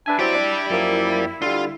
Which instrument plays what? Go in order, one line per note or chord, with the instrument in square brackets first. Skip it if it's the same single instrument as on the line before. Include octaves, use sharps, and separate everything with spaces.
[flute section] D4 A5 [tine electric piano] B4 E5 G#5
[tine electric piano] F#3 C4 [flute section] E4 [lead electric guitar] G4 D5
[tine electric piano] D4
F#2 F3 A#3
[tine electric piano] D3 G3 [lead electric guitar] F4